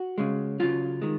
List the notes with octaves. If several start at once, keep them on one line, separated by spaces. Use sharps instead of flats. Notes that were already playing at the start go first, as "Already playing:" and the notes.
Already playing: F#4
C#3 G#3
C#3 F#3 F4
D#3 G#3